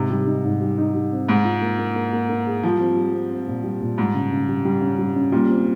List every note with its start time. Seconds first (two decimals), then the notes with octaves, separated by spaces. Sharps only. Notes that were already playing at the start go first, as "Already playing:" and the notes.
Already playing: G#2 C3
0.10 G3
0.27 D#4
0.44 G#2
0.61 G3
0.78 D#4
0.95 G3
1.12 C4
1.28 G#2 G#4
1.45 F4
1.62 A#3
1.79 A#3
1.96 A#3
2.13 A#3
2.29 A#3
2.46 G#4
2.63 F3 G3
2.80 C4
2.97 G3
3.14 C4
3.30 C4
3.47 A#2
3.64 G3
3.81 A#2
3.98 G#2 G3
4.14 C#3
4.32 C#3
4.48 G3
4.65 G3
4.81 C#4
4.99 G3
5.16 C#4
5.32 A#2 G3
5.49 C4